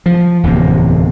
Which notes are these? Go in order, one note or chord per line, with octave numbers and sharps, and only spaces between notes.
F3
D1 E2 C3 A#3